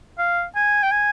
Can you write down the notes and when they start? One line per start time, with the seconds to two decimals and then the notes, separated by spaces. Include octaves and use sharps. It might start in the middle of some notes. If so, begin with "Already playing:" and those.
0.18 F5
0.55 G#5
0.83 G5
0.91 G#5